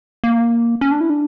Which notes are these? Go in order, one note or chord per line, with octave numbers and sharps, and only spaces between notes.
A#3
C#4
D4
E4
D4